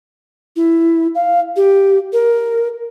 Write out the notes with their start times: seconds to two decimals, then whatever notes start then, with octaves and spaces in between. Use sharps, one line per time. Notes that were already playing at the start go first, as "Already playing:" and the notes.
0.56 E4
1.15 F5
1.56 G4
2.13 A#4